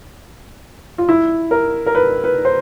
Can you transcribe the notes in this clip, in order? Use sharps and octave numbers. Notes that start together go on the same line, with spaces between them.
F4
E4
A#4
A#4
B4
B4
C5